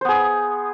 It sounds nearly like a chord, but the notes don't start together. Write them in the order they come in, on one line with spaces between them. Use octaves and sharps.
C5 B3 G#4